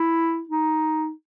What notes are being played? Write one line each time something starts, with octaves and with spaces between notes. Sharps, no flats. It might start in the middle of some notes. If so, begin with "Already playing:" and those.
Already playing: E4
D#4